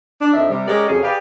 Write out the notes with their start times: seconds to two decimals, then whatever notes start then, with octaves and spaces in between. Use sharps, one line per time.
0.21 D4
0.34 F2 D#3 F3 D4 E5
0.50 C3 G3
0.67 G#3 C#4 G4 A#4 D5
0.88 F2 C#3 F#3 G#4
1.03 G4 G#4 B4 D5 F5